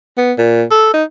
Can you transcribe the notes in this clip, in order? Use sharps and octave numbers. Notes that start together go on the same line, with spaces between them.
B3
A#2
A4
D#4